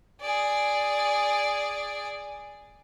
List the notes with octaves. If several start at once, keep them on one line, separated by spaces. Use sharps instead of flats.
G#4 D5